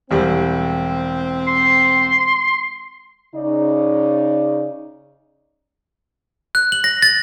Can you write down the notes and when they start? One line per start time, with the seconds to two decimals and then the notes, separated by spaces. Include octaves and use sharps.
0.11 E1 G3 C4
1.47 C6
3.35 C#3 D#4 D5
6.55 F#6
6.72 F#7
6.84 A#6
7.02 A6